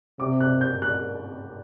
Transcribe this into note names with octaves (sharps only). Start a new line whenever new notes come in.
C3 D6
F#6
G6
F#6